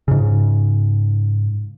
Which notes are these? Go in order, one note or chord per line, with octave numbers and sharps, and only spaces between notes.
G#2 C#3